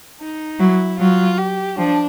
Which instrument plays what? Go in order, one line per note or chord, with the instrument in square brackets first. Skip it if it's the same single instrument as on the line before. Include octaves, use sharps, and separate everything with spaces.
[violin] D#4
[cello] F#3 [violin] E4
[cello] F#3 [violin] F4
[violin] G4
[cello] F3 [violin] D4